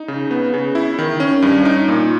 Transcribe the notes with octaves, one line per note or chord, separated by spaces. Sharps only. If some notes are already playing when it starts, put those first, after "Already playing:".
Already playing: D#4
C#3
B3
C#3
E4
D#3
C#4
G2
D#4
A#2